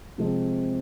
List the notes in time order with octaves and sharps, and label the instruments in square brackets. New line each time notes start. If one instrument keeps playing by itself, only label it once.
[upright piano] C3 F3 G#3 C4